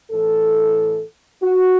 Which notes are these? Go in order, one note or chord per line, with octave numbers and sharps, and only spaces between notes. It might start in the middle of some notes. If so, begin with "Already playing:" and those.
A2 E3 A4
F#4